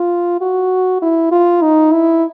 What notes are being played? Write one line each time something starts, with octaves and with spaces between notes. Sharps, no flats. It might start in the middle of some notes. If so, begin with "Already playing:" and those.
Already playing: F4
F#4
E4
F4
D#4
E4